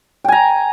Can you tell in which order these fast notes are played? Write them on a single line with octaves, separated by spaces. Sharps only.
G5 G#5 A#5